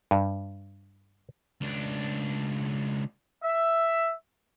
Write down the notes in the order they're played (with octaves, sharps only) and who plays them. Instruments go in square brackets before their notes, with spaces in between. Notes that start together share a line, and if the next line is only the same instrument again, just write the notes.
[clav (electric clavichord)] G2
[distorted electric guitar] C#2 D4
[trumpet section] E5